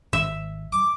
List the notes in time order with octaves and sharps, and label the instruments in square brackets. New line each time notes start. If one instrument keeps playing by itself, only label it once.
[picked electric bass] G#1 [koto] E5
[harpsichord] D6